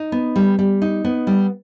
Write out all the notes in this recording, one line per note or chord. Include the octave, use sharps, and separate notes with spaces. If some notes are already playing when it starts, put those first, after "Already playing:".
Already playing: D#4
B3
G3
G3
D#4
B3
G3